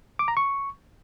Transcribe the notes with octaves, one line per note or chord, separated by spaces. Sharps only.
D6
A#5
C#6